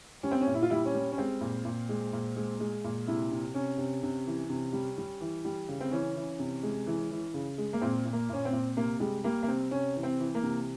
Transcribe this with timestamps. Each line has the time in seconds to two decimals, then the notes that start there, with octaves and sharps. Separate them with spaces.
0.23 G3 C#4
0.32 C4
0.41 C#4
0.47 A#2
0.54 E4
0.62 F4
0.70 G3 E4
0.85 C#4
0.94 G3
1.12 C#4
1.18 G#3 C4
1.41 A#2
1.65 A#2
1.89 G#3
2.13 A#2
2.36 G#3
2.60 G#3
2.84 A#2
3.07 C3 E4
3.31 C3
3.54 C3 C#4
3.78 C3
4.03 C3
4.27 E3
4.50 C3
4.73 G3
4.98 G3
5.21 E3
5.45 G3
5.69 C#3
5.81 C4
5.91 E3 C#4
6.16 E3
6.39 C3
6.63 G#3
6.87 E3
7.11 E3
7.34 C#3
7.58 G#3
7.73 A#3
7.82 A#2 C4
8.06 A#2
8.13 A#3
8.29 A#2 C#4
8.45 C4
8.53 A#2
8.76 C3 A#3
9.00 G3 G#3
9.24 G3 A#3
9.43 A#3
9.48 C3 C4
9.71 C3 C#4
9.96 E3
10.03 C4
10.19 E3
10.35 A#3
10.43 C3